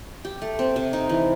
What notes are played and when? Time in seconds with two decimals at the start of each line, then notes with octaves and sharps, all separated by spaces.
0.25 G4
0.42 A3
0.59 C4
0.76 C3
0.93 D#4
1.09 E3